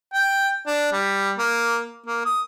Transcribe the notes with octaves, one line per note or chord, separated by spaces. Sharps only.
G5
D4
G3
A#3
A#3
D#6